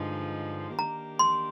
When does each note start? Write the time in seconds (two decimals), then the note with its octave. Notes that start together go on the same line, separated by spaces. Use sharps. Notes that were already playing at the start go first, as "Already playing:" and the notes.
Already playing: G2 D3 F3 G#3 D#4
0.77 D#3 A#3 D4 G4 A#4 A#5
1.19 C6